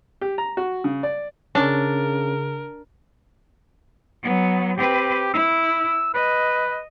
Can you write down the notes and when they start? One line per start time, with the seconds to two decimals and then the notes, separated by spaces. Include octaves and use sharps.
0.21 G4
0.38 A#5
0.57 F#4
0.84 C#3
1.03 D5
1.55 C#3 C#4 D4 A#4
4.23 F#3 B3
4.78 C4 G4 B4
5.34 E4 E6
6.14 B4 D#5